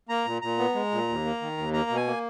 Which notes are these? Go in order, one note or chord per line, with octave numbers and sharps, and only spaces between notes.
A#3 A#5
A#2
A#2 A#5
B3
G#3
A#2
D#2
A#3
D#3
D#2
A#3 A#5
B2
G#5
A#3